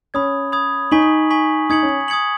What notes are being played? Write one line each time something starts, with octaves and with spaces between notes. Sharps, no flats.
C#4 B5 D#6 G#6
B5 D#6 G#6
D#4 G#5 C#6 B6 F#7
G#5 C#6 B6 F#7
D#4 D#6 G#6 C#7 F#7
C#4
D#6 G#6 C#7 F#7